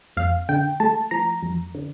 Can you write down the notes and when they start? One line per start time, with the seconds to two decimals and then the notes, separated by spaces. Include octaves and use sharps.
0.17 F2 F5
0.49 D3 G5
0.80 A3 A5
1.11 F3 A#5
1.43 F2
1.75 D3